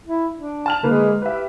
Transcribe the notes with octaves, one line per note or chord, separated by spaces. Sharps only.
E4
D4
A5 F6 F7
D3 G#3 A#3 B4
G4 B4 E5